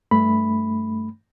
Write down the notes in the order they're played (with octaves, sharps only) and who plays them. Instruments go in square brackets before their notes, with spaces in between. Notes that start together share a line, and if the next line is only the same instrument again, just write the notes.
[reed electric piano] G2 A3 B5